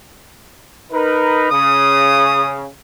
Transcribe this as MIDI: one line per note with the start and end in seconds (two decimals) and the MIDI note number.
0.92 1.50 63
0.92 1.50 70
0.92 1.50 71
1.51 2.67 49
1.51 2.51 87